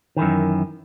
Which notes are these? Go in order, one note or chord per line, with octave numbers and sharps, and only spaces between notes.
F#2 D#3 E3